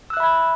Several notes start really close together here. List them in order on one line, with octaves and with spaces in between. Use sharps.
E6 F#6 E5 B5 G#6